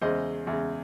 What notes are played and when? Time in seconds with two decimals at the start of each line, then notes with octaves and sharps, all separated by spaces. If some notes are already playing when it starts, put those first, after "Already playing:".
0.02 E2 C#3 G#3 C5 D#5
0.47 E2 C#3 G#3